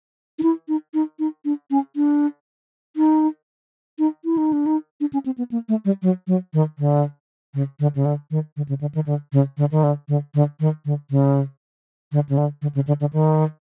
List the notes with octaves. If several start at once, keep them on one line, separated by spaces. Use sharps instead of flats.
D#4
E4
D#4
D#4
D#4
D4
C#4
D4
D#4
D#4
E4
D#4
D4
D#4
D4
C#4
C4
B3
A#3
A3
G3
F#3
F#3
D#3
D3
C#3
D3
C#3
D3
D#3
D3
C#3
D3
D#3
D3
C#3
D3
D#3
D3
D3
D3
D#3
D3
C#3
D3
C#3
D3
D3
C#3
D3
D3
D#3